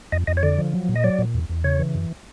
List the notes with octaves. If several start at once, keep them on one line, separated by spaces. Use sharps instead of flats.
F2 D#5
F2 D#5
C#5
D3 D5
F3
F#3
A#2
D#5
F#3 D5
A#2
E2
E2
C#3 C#5
E3
F#2